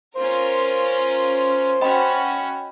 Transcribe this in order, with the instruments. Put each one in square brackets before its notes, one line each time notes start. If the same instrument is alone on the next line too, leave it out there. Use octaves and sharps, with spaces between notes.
[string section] C#4 F4 A#4 [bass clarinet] C5
[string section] C#4 F#4 [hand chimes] D#5 G5 B5